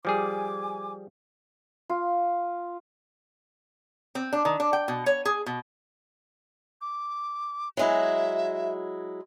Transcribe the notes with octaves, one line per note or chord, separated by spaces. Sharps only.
F3 G3 G#4 G#5 D6
F4
C4
D4
D#3
D4
G5
B2
C#5
G#4
B2
D6
F#3 G#3 E4 E5